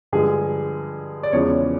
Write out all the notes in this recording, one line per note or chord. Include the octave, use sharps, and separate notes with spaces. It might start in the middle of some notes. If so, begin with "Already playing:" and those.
G2 D3 F3 G#3 G#4
D5
E2 C#3 F3 G#3 C#5